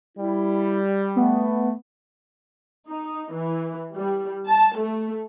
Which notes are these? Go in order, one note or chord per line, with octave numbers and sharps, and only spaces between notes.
G3 E4
A3 B3
D#4
E3
G3
A5
A3